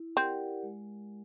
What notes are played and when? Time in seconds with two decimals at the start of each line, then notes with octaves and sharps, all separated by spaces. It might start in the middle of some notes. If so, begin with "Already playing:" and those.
Already playing: E4
0.16 C4 G4 A#4 D5 F#5
0.63 G#3